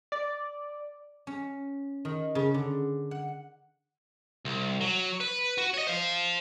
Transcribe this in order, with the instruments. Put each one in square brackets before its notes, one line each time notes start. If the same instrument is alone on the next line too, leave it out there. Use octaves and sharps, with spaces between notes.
[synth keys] D5
[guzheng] C#4
D#3
C#3
D3
F#5
[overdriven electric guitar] C2
F#3
B4
F#4
C#5 D#5
C5 F5